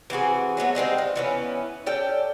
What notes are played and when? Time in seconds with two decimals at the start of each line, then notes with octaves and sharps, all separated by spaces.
0.10 E3 C4 F#4 G#4
0.57 F#3 A3 B3 F#4
0.75 G3 G#3 C4 D#4
0.98 F4
1.16 E3 B3 C#4
1.86 C#4 A4 D5 G5